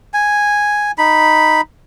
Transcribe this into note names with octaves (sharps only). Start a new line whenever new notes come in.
G#5
D#4 B5